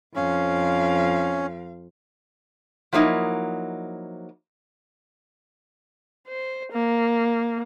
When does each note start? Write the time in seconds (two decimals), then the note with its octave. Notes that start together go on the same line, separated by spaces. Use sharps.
0.15 F2 C#4 F5
2.93 F3 F#3 A#3 D#4 E4
6.27 C5
6.72 A#3